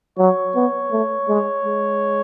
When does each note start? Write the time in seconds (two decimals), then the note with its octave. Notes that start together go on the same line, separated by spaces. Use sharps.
0.18 F#3 C#5
0.55 B3
0.92 A3
1.28 G#3
1.65 G#3